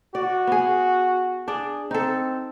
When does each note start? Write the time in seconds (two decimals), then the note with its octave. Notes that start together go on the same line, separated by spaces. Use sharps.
0.15 F#4 D5
0.47 B3 G#4
1.48 D4 G#4 D5
1.91 C4 D#4 A4